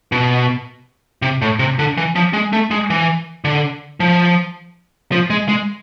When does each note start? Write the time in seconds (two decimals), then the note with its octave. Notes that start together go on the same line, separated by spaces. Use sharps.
0.12 B2
1.22 C3
1.42 A2
1.59 C3
1.79 D3
1.97 E3
2.15 F3
2.33 G#3
2.53 A3
2.71 G#3
2.90 E3
3.44 D3
4.00 F3
5.12 F3
5.30 G#3
5.48 G#3